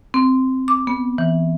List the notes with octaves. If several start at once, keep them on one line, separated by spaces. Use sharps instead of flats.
C4
D6
B3
E3